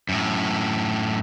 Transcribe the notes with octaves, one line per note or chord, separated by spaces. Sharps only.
F#2 A2